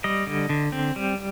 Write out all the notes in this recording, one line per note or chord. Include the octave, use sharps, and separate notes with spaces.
G3 D#5
D3
D3
C4
G3